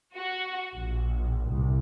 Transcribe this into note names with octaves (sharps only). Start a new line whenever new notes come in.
F#4
A#1
C2